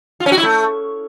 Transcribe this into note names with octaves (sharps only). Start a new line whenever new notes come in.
F4
C#4
F#4
E4
A3